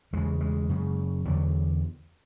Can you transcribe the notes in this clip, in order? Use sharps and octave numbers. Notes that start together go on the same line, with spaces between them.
E2 C#3 G#3
G#3
F#2 C#3
E2 D3 F#3